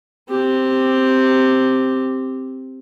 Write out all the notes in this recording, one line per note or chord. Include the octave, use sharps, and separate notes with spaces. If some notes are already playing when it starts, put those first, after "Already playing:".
C4 G4